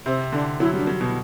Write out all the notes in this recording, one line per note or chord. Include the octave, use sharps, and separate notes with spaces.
C3 C4
D3 D4
F#3 E4
G3 D4
F#3
B2